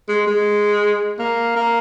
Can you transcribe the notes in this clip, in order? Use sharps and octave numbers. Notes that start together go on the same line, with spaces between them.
G#3
G#3
A#3
A#3